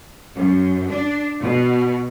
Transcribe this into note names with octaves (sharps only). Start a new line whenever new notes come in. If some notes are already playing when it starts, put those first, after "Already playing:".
F#2
D4
B2